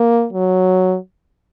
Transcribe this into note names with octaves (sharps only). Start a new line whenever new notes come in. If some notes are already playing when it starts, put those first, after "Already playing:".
Already playing: A#3
F#3